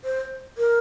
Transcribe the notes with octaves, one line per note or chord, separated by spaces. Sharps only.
C5
A#4